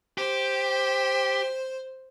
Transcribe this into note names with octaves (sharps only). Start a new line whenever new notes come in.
G4 C5